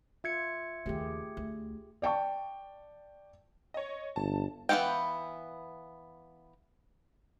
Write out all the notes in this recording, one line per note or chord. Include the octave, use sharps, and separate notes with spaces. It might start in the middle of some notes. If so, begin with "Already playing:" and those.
F4 E5 G#6 C#7
D#2 C#3 A3 G4 G#4
D2
D5 G5 A5 C#6
C#5 D#5
G1 A5
E3 B3 F#4 F5 G5